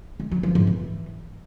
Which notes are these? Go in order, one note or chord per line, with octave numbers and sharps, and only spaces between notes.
G#3
F#3
F3
G#2
E3